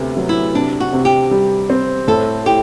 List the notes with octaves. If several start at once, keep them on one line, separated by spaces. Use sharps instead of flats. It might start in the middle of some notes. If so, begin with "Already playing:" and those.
Already playing: D2 C3 B3
F#3
E4
C3 D4
F#4
C3
G4
G3
C4
A2 A4
E4 G4